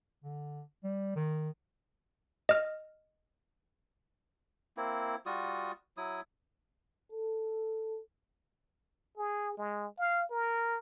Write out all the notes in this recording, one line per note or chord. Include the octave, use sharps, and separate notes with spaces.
D3
G3
D#3
D#5 F6
A#3 C4 E4
G3 F4 F#4 D#6
F#3 E4 D#6
A4
G#4
G#3
F5
A#4